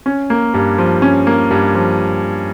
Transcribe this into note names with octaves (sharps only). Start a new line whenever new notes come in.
C#4
A#3
G2
F3
C#4
A#3
G2
F3